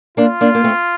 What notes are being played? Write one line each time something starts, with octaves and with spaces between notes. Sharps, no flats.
A#3 D4 F4
A#3 D4
A#3
A3 C4